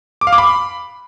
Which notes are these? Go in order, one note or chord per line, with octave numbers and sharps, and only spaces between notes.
D6
F5
D6
B5